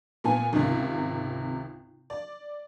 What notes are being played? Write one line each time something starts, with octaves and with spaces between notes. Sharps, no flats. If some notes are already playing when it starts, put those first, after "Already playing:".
A#2 B3 G#5
G#1 C#2 C3
D5